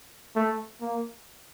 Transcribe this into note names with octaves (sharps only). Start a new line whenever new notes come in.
A3
A#3